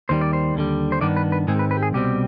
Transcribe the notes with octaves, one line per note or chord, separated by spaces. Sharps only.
D#2 D#3 G3 C5
D5
C5
D#2 D3 G3
C5
G2 D#3 B3 D4 D5
B4
B4
G#2 D#3 G#3 C4 G#4
B4
B4
G4
G#4
C2 B2 G3 C4 G4